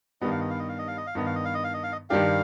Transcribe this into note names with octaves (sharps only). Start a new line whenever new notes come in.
G2 D#3 G3 B3 D#5
F5
D#5
F5
D#5
F5
D#5
F5
D#5
F5
G2 D#3 B3 D#5
F5
D#5
F5
D#5
F5
D#5
F5
D#5
G2 D#3 G3 D4 G4 F5